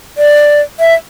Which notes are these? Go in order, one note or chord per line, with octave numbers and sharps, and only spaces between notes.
D5
E5